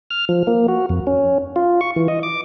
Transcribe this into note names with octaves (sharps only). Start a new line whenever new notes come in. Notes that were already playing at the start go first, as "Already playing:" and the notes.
F6
F3
A#3
F#4
F2
C#4
F4
C#6
E3
D#5
D6